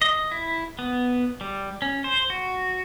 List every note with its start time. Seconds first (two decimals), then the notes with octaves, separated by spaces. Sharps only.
0.02 D#5
0.32 E4
0.79 B3
1.41 G3
1.82 C#4
2.04 C5
2.30 F#4